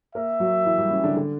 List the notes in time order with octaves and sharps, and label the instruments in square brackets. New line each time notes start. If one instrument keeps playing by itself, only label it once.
[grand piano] A#3 A#4 [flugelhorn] E5
[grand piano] F#3 F#4
E3 E4
G3 G4
C#4
D3 D4
D3 D4